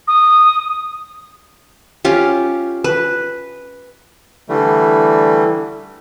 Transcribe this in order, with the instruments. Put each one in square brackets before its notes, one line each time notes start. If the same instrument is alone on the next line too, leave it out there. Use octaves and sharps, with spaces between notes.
[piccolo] D#6
[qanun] C#4 F4 G4
B4
[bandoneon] D3 E3 G3 A3